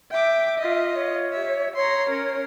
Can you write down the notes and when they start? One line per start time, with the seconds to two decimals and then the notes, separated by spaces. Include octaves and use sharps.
0.12 E5 G5 D6
0.59 F4 D#5
0.95 C#5
1.33 G4 E5
1.76 C#5 A#5 C6
2.09 C#4 A#4